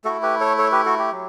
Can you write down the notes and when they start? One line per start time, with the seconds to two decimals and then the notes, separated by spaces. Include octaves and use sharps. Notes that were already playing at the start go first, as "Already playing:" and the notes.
0.05 A3 E4 F#4 A4
0.22 G4 B4
0.41 A4 C#5
0.58 A4 C#5
0.72 G4 B4
0.85 F#4 A4
0.99 G4
1.12 F#3